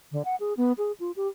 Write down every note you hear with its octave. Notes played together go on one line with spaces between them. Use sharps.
D3
F#5
G#4
B3
G#4
F4
G4